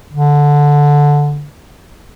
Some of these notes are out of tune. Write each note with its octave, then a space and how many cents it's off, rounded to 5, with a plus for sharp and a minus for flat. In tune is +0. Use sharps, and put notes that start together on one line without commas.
D3 -10